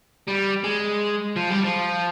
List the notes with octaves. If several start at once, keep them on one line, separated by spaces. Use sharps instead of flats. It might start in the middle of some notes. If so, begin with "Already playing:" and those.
G3
G#3
F3
G3
F3